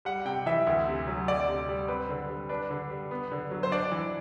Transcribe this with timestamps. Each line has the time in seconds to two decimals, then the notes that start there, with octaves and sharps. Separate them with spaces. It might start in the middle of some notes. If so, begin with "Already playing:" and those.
0.05 G3 F#5
0.25 C3 G5
0.46 E3 E5
0.67 D2
0.88 C3
1.07 F#3
1.28 D2 D5
1.48 C3
1.69 G3
1.88 C4 B4
2.09 D3
2.29 G3
2.49 D4 B4
2.70 D3
2.90 G3
3.11 B3
3.32 D3
3.51 F#3
3.63 C5
3.72 D4 D5
3.92 E3